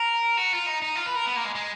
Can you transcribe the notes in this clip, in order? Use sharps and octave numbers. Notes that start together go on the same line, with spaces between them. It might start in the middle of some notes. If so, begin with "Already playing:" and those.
Already playing: A#4
F#4
F4
D#4
D#4
F4
B4
A#4
B3
A#3
G#3
G#3